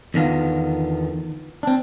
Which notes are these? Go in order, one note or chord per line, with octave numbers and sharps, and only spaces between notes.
E2 D3 D#3 B3 F4
C4 D4